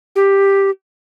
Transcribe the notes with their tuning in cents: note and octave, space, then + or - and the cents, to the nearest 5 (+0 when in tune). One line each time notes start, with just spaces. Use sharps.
G4 +5